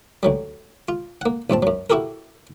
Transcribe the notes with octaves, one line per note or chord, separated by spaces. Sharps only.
D2 F#3 G3
F4
A#3 F#5
A#1 G2 C4 A5
F#2 F#3
E4 F#4 G4 A4 A#4